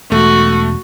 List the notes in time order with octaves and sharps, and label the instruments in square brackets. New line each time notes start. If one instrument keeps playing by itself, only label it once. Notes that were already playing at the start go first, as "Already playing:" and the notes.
[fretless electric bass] E1 [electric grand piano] A3 [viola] F#4